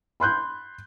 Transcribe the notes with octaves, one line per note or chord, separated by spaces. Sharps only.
B5 C6 F#6 G6